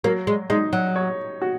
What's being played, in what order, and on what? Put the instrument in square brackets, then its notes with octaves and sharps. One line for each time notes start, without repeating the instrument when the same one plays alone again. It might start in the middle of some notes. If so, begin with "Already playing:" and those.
[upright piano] F#3 [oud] A#3
[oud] G#3
[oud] G#3 [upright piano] D#4
[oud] F#3
[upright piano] C#5
F#4